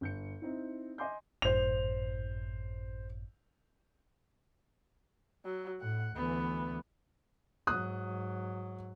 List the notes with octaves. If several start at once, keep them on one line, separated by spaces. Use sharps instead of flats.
G1 G6 C#7
C4 D#4 E4
D#5 G#5 C6 D6 G6
G#1 F#2 A2 C5 F7
F#3
A2 F#5
D2 E3 B3
G#2 F#3 D#6 F#6